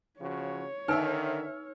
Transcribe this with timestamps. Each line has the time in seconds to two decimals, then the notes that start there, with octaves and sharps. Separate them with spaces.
0.20 C#3 F3 F#4 C#5
0.88 D3 D#3 D#4 B4 E5 G#5 E6 F6